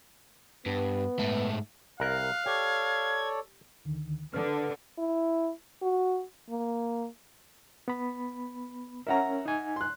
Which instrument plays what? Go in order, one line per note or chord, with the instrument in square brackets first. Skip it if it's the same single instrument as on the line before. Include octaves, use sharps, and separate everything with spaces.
[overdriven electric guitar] G2 [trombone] B3
[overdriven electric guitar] G#2 A3
[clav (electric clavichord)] C2 A#4 [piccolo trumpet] F5 [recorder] F#6
[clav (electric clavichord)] G4 [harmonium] A4 C#5 D5 [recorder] G#6
[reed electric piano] D2 D3 D#3
[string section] D3 [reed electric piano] B4 F6
[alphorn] E4
F#4
A#3
[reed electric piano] B3 B5
[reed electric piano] C#4 A#4 [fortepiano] E5 F#5 A#5
[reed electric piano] D#4 G#5
[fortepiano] C6 F#6